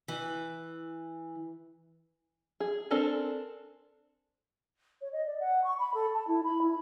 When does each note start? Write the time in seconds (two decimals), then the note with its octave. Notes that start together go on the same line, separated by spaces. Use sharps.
0.08 E3
2.60 G#4
2.91 C4 D4 A4 A#4 G#5
5.01 C#5
5.12 D#5
5.26 D5
5.39 F#5
5.63 C#6
5.79 B5
5.94 A4
6.13 A5
6.27 E4
6.43 B5
6.61 E4